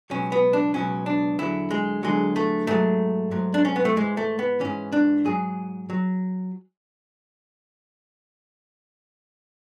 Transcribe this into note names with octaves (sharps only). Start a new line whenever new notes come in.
C#2 B2 F#3 C#4
B3
D4
C#2 B2 F#3 C#4
D4
E2 D3 F#3 E4
G#3
E2 D3 F#3 G#3
A3
G#2 F#3 A3
G#2 F#3
D4
C#4
B3
A3
G#2 E3 G#3
A3
B3
G#2 E3 C#4
D4
G#2 F#3 G#4
F#3